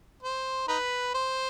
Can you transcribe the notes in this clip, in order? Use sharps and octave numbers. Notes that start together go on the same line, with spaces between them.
C5
D#4 B4
C5